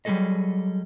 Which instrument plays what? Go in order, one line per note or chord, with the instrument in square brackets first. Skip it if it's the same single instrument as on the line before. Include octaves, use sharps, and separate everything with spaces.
[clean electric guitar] F#3 G3 A3 G#4 A4 D#5